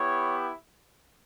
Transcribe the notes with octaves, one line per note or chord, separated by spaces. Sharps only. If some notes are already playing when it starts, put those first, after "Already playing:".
Already playing: B3 E4 G4 C#5